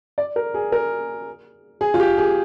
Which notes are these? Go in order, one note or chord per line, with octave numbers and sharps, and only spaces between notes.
D5
A#4
G#4
A#4
G#4
F4
G4
G#4